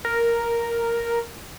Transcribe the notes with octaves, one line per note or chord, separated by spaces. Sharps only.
A#4